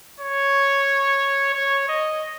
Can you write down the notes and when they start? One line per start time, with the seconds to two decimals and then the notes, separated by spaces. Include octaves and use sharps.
0.21 C#5
1.54 C#5
1.89 D#5